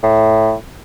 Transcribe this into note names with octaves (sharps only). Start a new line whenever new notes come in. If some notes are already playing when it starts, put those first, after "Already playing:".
A2